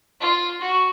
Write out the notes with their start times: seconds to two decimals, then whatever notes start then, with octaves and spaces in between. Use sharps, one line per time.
0.21 F4
0.61 F#4